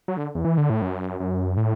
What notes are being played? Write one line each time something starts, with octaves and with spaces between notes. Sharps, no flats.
F#3
D3
E2
E3
D3
A2
F#2
F#2
A2